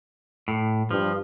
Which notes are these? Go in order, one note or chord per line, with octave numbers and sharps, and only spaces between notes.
A2
G2 F3